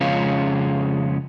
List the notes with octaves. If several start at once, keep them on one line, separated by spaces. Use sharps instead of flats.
F2 C#3 G#3 C#4 F4